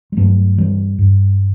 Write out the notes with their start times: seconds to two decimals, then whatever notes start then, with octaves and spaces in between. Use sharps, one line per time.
0.12 G3
0.17 G2 F#3 A3
0.58 E3 G3
0.99 G2